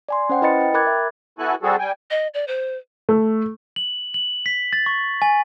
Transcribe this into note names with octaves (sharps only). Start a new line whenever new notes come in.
D5 G#5 C6
C#4 C5 F#5 G5
E4 B4 D#5 B5 A6 C#7
G5
A#4 B5 D6 F#6 G#6 A6
E5
B3 E4 F#4 A4 G#5 F#6
G3 C4 F#4 G#4 A4
G3 G5 G#5
D#5
D5
C5
A3
F#7
F#7
B6
A6
C#6
G#5